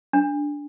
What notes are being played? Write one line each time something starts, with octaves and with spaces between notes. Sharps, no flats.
D4